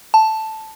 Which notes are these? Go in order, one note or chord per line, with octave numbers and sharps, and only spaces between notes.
A5